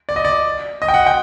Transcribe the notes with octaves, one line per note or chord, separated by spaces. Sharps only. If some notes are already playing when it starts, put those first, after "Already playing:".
D5
D#5
D5
D#5
G5
F#5
G5